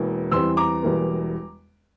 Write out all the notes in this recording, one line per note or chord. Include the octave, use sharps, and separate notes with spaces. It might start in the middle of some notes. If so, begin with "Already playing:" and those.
Already playing: E1 E2 E3 A#3
E2 E3 G3 C4 C6 E6
A#5 D6
E1 E2 E3 G3 A#3